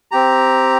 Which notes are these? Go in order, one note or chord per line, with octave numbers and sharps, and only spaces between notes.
C4 G4 A#5